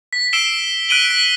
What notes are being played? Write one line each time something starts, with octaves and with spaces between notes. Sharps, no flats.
B6
E6 C7 D7 E7 G7
F#6 B6 D7 D#7 F#7 G7
B6